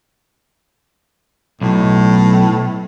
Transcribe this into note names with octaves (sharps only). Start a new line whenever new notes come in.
B1 A2